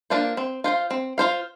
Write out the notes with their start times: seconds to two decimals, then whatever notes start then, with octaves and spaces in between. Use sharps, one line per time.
0.10 A#3 D4 F4 C5
0.37 C4
0.64 F4 C5 F5
0.91 C4
1.18 F4 C5 F5